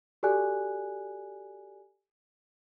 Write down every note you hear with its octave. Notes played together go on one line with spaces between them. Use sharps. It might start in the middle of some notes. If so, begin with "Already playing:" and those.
F#4 G4 A4 D5 G#5 F#6